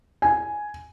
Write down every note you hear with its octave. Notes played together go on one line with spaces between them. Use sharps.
G#5